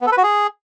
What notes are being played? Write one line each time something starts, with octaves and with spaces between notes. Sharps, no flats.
B3
A4
B4
F#4
G#4